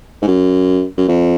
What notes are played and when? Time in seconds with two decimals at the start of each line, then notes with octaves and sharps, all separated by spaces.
0.22 G#2
0.27 F#2
0.97 F#2
1.08 F2